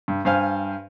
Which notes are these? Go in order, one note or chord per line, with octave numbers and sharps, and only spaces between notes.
G2
G2 C5 F5 G#5 F6